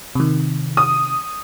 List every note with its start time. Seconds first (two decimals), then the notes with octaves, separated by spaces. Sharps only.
0.15 C3 D#3
0.77 D#6